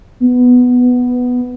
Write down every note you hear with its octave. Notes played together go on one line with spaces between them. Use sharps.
B3